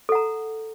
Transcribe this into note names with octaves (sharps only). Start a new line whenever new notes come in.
A4 F#5 A#5